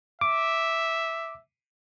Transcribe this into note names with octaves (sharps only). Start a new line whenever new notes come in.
E5 D6